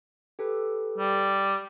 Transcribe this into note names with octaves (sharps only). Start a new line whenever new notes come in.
G4 A4 B4
G3